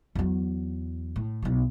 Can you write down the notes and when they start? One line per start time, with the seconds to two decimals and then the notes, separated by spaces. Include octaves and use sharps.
0.15 E2 F#3
1.16 A2
1.42 B1 F#3